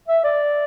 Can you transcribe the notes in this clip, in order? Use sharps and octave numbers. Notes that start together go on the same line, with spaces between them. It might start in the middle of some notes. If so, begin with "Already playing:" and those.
E5
D5